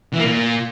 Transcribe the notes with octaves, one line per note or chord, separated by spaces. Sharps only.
E3
A#3
A#2